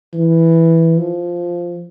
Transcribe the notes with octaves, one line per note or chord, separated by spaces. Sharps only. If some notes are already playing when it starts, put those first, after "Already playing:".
E3
F3